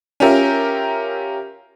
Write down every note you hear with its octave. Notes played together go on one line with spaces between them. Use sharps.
C#4 F4 G4 A#4 E5